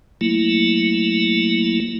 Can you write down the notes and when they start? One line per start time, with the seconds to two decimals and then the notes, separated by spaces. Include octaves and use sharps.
0.21 F#3 A3 A#3 E4